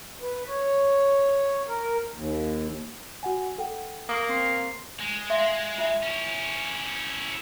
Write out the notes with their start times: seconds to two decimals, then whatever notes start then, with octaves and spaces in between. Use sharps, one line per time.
0.22 B4
0.47 C#5
1.68 A#4
2.13 D#2
3.23 F#4 F#5 G#5
3.58 A4 F#5 G5
4.09 A#3 C#6 D#6
4.29 C4 C6 C7
5.00 G#3
5.30 E5 F5 C6
5.78 F4 E5
6.03 C#4 E4